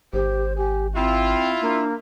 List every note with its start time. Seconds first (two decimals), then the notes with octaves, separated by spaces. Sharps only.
0.13 G#1 G4 C5
0.57 G4 G#5
0.96 C4 E4 F4 G5
1.62 A#3 D4